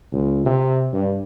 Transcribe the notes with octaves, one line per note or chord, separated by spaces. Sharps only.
C#2
C3
G2